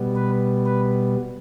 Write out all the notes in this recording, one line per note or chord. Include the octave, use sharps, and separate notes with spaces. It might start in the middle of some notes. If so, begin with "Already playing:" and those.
Already playing: B2 G3 B3
B4
B4